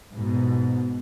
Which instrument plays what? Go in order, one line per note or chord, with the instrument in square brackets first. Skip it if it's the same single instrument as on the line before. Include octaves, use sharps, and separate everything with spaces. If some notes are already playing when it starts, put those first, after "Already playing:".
[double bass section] G#2 B2